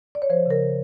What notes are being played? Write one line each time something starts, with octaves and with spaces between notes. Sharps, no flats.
D5
C#5
F3 C5
C#3 A#4